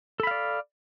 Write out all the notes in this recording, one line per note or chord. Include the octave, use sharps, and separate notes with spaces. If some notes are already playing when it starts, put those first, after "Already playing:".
A4 D5 F5 B5